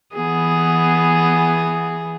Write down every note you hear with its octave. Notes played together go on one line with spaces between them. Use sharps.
E3 B3 G#4